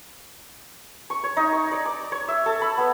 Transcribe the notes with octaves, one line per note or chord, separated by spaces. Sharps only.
C#6
C#5
D#4
C#6
D5
D6
C#5
E5
A4
B5
B3